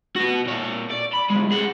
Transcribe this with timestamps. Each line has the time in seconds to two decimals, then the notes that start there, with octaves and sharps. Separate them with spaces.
0.16 B3 F#4
0.46 A#2 C#5
0.90 D5
1.13 B5
1.30 B1 G#3
1.51 G#4 F#5